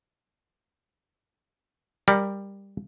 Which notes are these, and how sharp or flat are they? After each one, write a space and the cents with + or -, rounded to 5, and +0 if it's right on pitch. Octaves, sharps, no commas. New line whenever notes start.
G3 +15 A#4 +0